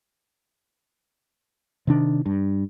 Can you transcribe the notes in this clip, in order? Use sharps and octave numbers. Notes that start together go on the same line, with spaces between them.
C3 D#3 D4
G2